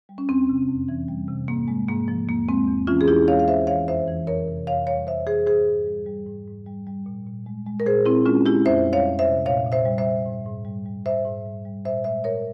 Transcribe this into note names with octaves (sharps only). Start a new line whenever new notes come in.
G3
C#4
E2 C4
C3
F2
E3
G3
C3
G#2 A#3
G#3
G#2 A#3
F3
E2 A#3
G#3 C4
E2
E3 C#4 F4
G#4
E2 E4 G4
G#3 C#5 F5
F5
E2 C5 E5
E3 C#5 F5
F2 C5 E5
E3
F2 A#4 C#5
C3
F2 C#5 F5
G3 C#5 F5
F2 C5 E5
E3 G#4 C5
G#2 G#4 C5
G#2
G3
G3
G#2
G#2
G3
G3
A#2
A#2
G#3
G#3
A#4
A#2 G#4 C5
A#2 C4 E4
G#3 C#4 F4
G#3 E4 G4
F2 C5 E5
G3
C#5 F5
F2
C5 E5
C3
A#2 C#5 F5
A#2
C5 E5
G3
C5 E5
G3
G#2
G#2
G3
G3
G#2 C5 E5
G#2
G3
G3
A#2 C5 E5
G#3 C5 E5
A#2 A#4 C#5